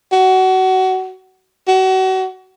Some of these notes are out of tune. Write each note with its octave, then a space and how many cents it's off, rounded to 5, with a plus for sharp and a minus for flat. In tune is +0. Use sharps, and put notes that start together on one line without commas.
F#4 +25
F#4 +30